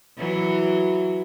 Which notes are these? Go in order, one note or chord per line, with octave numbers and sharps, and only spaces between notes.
E3 F#3